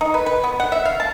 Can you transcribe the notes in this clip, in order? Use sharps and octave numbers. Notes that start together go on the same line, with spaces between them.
D#4
B4
B4
B3
F#5
E5
F5
A5